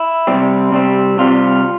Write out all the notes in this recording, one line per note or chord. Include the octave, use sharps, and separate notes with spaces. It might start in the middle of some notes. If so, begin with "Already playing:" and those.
Already playing: E4
C3 G3 C4
C3 G3 C4
C3 G3 C4 F4